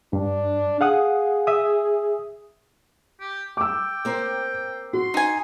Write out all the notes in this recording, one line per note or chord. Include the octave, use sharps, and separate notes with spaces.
G2 D4
G#4 F5 F#5 D#6
E5 D#6
G4
G5 D6 E6
A#3 C4 C5
F#4 C6
D#4 G#5